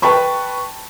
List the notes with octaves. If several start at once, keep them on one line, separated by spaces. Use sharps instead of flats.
B4 G5 A5 B5 C#6